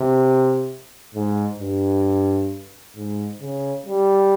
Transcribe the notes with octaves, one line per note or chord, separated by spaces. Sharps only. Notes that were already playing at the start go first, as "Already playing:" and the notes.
Already playing: C3
G#2
G2
G#2
C#3
G3